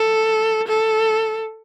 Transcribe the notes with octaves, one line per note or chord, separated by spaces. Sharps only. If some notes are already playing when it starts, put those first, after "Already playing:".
Already playing: A4
A4